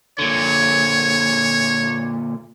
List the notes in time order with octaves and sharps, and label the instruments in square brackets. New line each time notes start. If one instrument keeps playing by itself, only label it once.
[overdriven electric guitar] A#2 D3 [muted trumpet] C#5